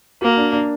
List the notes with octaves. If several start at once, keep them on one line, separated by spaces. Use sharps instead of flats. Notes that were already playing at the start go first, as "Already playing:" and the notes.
A#3 F#4
D4
D4